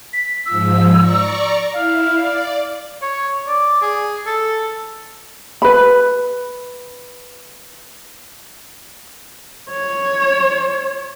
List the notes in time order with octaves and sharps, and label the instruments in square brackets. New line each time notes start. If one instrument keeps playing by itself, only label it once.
[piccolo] B6
[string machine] G#2 F3 [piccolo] E6
[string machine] D5 A#5 C#6
[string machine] E4 [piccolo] F5
[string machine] D5
[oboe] C#5
D5
G#4
A4
[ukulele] B4 B5
[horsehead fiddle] C#5